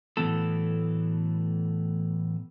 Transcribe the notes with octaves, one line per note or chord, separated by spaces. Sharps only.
A2 E3 F#3 A3 B3 A4